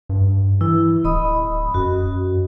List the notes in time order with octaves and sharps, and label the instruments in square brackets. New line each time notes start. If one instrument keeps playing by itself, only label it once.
[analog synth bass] G2
[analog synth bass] E3 [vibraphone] E4
[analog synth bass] D1 [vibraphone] D#5 B5 D#6
[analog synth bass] F#2 [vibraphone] F#4